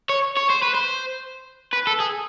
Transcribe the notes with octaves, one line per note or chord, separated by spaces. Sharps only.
C#5
C#5
C5
B4
C5
B4
A4
G#4